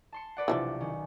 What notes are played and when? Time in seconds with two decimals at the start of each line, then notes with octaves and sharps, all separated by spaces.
0.12 A5 C6 C#7
0.37 B4 D5 F#5
0.48 B1 C3 E3 F3 D4
0.81 D#3 C#4